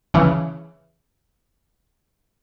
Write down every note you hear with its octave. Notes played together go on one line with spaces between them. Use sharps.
C#3 E3